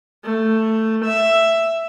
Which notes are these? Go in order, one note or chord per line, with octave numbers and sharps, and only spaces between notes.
A3
E5